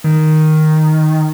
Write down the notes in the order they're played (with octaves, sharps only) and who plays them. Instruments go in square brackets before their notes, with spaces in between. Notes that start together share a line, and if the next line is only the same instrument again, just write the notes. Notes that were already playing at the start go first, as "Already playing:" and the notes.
[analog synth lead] D#3